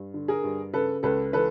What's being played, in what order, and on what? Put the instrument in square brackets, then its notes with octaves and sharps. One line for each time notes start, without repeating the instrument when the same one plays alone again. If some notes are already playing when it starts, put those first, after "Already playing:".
Already playing: [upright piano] G2
D3
G#4 A#4
G2
C#3 A4 B4
C#2 A4 B4
E3 A4 B4